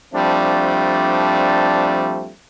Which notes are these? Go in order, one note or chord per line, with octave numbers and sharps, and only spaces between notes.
F3 G3 A3 C4 D4